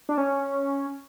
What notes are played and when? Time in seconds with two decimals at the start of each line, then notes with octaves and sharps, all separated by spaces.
0.09 D4
0.18 C#4